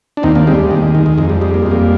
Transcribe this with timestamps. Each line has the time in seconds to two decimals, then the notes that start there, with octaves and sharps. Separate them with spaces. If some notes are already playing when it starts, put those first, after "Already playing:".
0.17 D4
0.23 D#2 C4 D#4
0.35 A#3 D4
0.47 G3 G#3 C4
0.59 G#3
0.71 D#2 G#3
0.82 G#3
0.94 D#3 G#3
1.06 G#3
1.18 F2 G#3
1.29 G3
1.41 G3 G#3
1.54 A#3
1.62 G#3
1.66 F2
1.71 G3 A#3